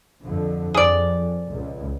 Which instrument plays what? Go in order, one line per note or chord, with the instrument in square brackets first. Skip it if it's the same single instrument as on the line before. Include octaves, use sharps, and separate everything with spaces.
[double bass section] F2 D3
[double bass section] F2 [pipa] G#4 D5
[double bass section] C#2